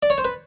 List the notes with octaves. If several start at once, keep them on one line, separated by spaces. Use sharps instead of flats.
D5
C#5
C5
B4